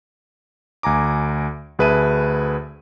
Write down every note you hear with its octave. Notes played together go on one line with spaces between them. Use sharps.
D2 G#5 A#5 D6
D2 G#4 B4 E5 A5 D#7